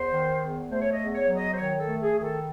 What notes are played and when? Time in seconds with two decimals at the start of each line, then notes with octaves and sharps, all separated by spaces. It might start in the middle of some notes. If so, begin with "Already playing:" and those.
Already playing: E2 C5
0.11 D#3
0.40 E2
0.70 A3 C5
0.81 C#5
0.92 D#5
0.99 E2
1.14 C#5
1.28 F#3
1.36 D#5
1.52 C5
1.57 D#3 C#5
1.80 A4
1.87 A3
2.01 G#4
2.16 D#3 G#4
2.23 A4